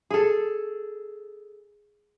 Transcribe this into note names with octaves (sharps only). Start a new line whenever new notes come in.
G#4 A4